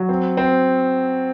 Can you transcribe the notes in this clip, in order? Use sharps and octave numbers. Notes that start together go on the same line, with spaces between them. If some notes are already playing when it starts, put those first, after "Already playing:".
Already playing: F#3
C4
C4